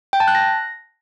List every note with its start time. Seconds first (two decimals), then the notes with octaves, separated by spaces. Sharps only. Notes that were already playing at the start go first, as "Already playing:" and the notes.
0.13 G5
0.20 A5
0.28 F#6
0.35 A#6